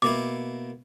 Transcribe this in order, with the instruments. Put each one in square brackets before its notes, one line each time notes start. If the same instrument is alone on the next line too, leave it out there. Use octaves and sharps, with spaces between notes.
[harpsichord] B2 A#3 E4 [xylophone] D6